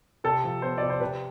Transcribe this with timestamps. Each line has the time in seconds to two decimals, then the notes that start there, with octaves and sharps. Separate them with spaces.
0.24 C3 A4
0.44 F3
0.62 B3 C5
0.78 C3 D5
0.90 C5
1.00 C3 B4